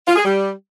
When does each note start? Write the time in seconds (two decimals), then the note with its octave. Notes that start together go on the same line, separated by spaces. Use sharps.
0.08 F4
0.16 G#4
0.25 G3